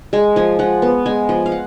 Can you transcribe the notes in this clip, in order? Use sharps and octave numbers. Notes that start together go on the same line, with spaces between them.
G#3 G#5
F3 G#5
F3 F#5
B3
G#3 G#5
F3
F5
F#5